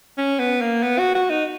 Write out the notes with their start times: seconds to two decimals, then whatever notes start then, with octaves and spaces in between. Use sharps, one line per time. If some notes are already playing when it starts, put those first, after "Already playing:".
0.18 C#4
0.39 B3
0.61 A#3
0.83 B3
0.98 F#4
1.15 F#4
1.30 D#4